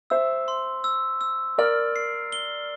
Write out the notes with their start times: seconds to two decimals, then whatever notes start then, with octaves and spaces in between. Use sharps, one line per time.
0.10 C5 E5 E6
0.48 C6
0.84 E6
1.21 E6
1.58 A#4 D5 F6
1.96 C7
2.32 G7